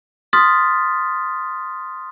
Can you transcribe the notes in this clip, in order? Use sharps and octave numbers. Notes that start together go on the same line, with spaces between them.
C6 D#6 F6 A6 B6